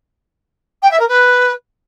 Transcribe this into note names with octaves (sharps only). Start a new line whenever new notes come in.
G5
E5
A#4
B4